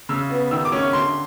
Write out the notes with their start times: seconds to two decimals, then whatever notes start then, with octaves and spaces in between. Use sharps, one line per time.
0.09 C#3 E6
0.31 B3
0.51 D#3 E6
0.65 D6
0.72 C#4
0.79 C#6
0.93 D3 C6